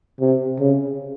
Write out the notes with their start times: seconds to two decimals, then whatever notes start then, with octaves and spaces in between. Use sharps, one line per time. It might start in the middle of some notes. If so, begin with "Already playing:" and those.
0.20 C3
0.60 C#3